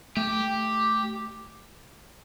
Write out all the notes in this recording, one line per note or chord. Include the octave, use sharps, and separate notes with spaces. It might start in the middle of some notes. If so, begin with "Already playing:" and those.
A3 G4